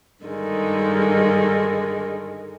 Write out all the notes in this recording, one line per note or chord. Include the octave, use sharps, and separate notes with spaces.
G2 D3 D#3 G#3